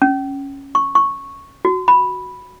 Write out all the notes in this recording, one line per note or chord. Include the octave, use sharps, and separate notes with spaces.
C#4
C#6
C#6
F#4
B5